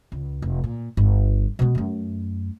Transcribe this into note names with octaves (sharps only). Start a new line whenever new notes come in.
C#2
F1
A#2
G1
B2 G#3
F#2 A3